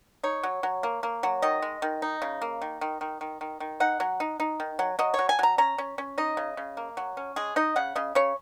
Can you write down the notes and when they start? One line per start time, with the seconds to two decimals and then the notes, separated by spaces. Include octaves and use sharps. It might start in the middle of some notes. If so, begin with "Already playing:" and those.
0.23 D#4 C#5
0.43 F#3
0.63 F#3
0.83 A#3
1.03 A#3
1.23 F#3
1.42 D#3 D#5
1.62 G#3
1.82 D#3
2.02 D#4
2.22 C#3
2.42 A#3
2.62 D#3
2.81 D#3
3.01 D#3
3.21 D#3
3.41 D#3
3.60 D#3
3.80 D#4 F#5
4.00 F#3
4.20 D#4
4.40 D#4
4.60 D#3
4.79 F#3
4.99 F#3 D#5
5.14 F#3 C#5
5.29 G#5
5.39 F#3 A#5
5.58 C#4 A#5
5.78 C#4
5.98 C#4
6.18 D#4 D#5
6.37 C#3
6.57 C#3
6.77 A#3
6.97 F#3
7.17 C#4
7.36 G#3 G#4
7.56 D#4 D#5
7.76 C#3 F#5
7.96 C#3 D#5
8.15 C#3 C#5